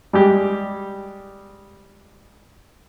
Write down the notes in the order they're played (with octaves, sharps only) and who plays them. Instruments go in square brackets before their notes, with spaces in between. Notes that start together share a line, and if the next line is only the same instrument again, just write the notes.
[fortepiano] G3 G#3 G4